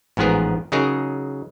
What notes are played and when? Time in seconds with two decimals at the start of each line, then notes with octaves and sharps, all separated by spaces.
0.17 A1 G#2 F3 B3 G#4 A#4
0.72 C#3 F#3 D#4 G#4 A#4